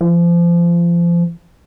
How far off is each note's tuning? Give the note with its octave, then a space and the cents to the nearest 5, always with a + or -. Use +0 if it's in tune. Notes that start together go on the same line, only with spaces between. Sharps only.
F3 -30